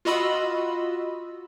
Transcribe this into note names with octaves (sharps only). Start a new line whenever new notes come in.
F4 F#4 D#5 B5 E6